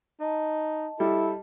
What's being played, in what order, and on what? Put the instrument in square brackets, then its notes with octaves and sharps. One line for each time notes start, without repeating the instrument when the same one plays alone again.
[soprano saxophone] D#4 [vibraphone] D#5 A5
[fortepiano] G3 [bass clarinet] E4 [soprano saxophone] A4